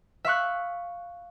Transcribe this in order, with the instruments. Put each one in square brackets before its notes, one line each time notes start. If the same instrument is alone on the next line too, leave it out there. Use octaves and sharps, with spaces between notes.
[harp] E5 F5 C#6 F#6